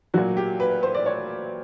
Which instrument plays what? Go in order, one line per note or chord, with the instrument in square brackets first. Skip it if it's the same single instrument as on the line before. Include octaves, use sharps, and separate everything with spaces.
[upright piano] A#2 F#3 F#4
G4
B4
C5
D5
C#5